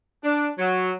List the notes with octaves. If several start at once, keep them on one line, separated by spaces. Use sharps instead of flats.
D4
F#3